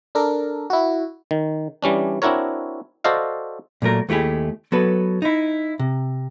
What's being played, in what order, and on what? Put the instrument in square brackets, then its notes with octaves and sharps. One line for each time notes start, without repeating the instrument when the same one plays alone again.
[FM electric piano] D4 A4 A#4
E4 F#4
[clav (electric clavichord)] D#3
E3 G3 C#4 D4
C4 D4 E4 F#4 A#4 C#5
F#4 A4 C5 D5 D#5 F5
[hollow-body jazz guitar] A#2 F#3 A3 A#4
D#2 A3 E4 G4 G#4
F#3 B3 A4 B4
D#4 E4
C3